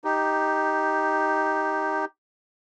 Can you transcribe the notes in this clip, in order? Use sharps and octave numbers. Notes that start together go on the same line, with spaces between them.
D#4 G4